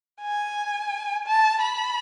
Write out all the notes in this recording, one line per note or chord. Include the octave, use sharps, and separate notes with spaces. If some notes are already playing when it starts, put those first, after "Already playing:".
G#5
A5
B5